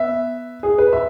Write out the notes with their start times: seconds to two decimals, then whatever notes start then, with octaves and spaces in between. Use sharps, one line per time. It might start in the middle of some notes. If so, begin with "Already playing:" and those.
Already playing: B3 E5
0.63 G#4
0.78 B4
0.93 E5